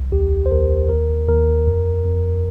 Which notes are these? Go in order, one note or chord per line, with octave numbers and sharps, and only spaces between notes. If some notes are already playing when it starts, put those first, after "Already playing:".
Already playing: C2
D#2 G4
C5
D#2 A#4
D#2 A#4
D#2 A#4
F2
F2